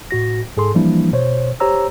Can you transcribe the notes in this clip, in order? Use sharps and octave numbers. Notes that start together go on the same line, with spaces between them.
A2 F#4 A#6
G#2 G#4 A4 C6
E3 F3 G3 A#3 D4 E4
B2 C5 C#5
G4 C5 C#5 A#5 E6